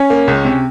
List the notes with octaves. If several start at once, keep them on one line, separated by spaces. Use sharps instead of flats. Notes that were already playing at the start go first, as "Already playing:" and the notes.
Already playing: C#4
A#3
C#2
C3